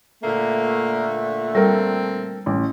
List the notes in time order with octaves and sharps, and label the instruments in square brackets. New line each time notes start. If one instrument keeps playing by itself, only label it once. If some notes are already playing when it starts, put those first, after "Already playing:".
[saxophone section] A#2 D3 A3 [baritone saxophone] A#3
[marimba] G3 [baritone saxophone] C4 [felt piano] A4 A#4
[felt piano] A1